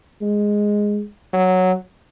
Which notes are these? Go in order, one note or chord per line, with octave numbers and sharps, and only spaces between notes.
G#3
F#3